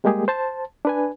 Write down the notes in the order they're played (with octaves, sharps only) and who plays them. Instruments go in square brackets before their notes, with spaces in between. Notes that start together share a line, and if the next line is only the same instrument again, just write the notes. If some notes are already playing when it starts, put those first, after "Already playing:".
[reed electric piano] G3 G#3 A#3 G4 G#4
C5 A5
D4 B4 G#5